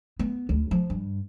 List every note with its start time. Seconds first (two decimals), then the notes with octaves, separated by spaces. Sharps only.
0.19 B3
0.49 D2
0.71 F3
0.90 G2